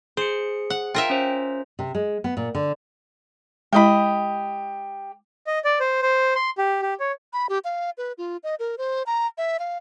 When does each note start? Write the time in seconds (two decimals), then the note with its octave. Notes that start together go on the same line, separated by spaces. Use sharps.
0.17 G#4 C5 C#7
0.70 F#5
0.95 F4 A#4 E5 G5
1.10 C#4 C5
1.79 C3
1.95 G#3
2.24 B3
2.37 A#2
2.55 D3
3.73 G#3 E4 G4 D#5 B5
5.47 D#5
5.65 D5
5.80 C5
6.02 C5
6.35 C6
6.58 G4
6.82 G4
7.00 C#5
7.33 B5
7.49 G4
7.65 F5
7.98 B4
8.18 F4
8.44 D#5
8.59 A#4
8.78 C5
9.06 A#5
9.38 E5
9.59 F5